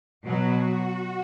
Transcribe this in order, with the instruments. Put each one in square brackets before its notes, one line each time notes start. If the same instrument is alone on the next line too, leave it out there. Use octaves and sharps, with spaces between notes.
[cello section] B2 F#3 F#4